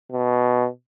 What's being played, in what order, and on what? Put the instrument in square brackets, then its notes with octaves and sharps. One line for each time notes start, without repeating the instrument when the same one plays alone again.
[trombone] B2